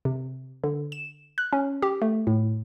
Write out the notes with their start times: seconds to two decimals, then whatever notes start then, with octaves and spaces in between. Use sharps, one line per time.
0.05 C3
0.64 D3
0.92 E7
1.38 F#6
1.53 C#4
1.82 G4
2.02 A3
2.27 A2